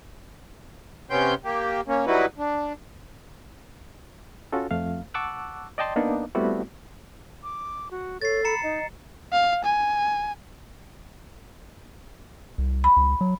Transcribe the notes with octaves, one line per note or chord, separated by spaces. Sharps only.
C3 B3 C#4 G5 C6 G6
A#3 G4
A#3 C#4
F#3 G3 D#4 E4 F#4 B4
D4
C#4 F4 F#4 A4
F2 A3 F5
F#5 A5 C#6 D6 E6 F#6
D5 D#5 G5 A5 C6
A#3 B3 D4 D#4
G3 A3 B3 C4 E4 F#4
D6
F#4
A4 C#5 A6 C7
A#5 B5 C#7
D#4 D#5
F5
G#5
C2
B5
C#2
F#3